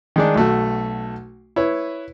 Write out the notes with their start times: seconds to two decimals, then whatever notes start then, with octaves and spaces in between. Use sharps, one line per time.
0.16 D#3 G#3 D4
0.35 B1 A3 F#4
1.56 E4 B4 C#5